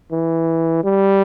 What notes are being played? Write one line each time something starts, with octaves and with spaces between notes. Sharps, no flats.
E3
G3